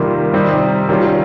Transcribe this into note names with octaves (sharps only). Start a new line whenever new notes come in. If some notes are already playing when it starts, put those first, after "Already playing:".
Already playing: C3 D#3 G3 A#3 F4
C3 G3 C4 D#4
D#3 G3 C#4 F4